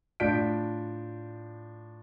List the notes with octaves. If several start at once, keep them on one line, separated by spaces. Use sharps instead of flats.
A2 D4 F4 G6 B6 D7